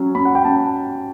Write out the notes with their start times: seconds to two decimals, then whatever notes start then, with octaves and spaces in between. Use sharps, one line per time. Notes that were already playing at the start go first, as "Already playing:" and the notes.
Already playing: F#3 C#4
0.15 C#4 B5
0.25 F#5
0.35 G5
0.45 C#4 A5